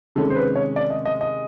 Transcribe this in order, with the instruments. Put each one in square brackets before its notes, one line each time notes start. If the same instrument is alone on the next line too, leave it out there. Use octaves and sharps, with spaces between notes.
[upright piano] C3 D#3 G#3 C#4 [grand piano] A4
[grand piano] C5
B4
C#5
D5
D#5
D#5
D#5